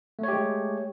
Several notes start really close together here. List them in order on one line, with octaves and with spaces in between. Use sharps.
A3 C#5 G4 G#3